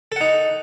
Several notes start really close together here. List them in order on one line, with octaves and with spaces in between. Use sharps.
A4 F#5 D#4